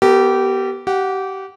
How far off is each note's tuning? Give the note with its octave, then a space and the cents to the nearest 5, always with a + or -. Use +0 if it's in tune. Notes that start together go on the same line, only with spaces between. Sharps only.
B3 -10 G4 -20 A#4 -45
G4 -25 F#5 -10